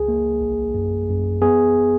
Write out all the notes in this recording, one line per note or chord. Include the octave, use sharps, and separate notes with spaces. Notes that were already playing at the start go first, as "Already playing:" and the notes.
Already playing: C#2 G#4
A#3
A#1
F#2
F#2
B3 G#4